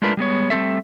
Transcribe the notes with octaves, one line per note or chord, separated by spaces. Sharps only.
G#3 A3 D4 F4 A#4 B4
G3 G#3 B3 C#5
G3 A3 C4 A4 E5